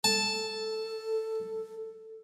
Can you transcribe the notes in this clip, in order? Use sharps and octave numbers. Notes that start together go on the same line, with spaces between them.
A4 A5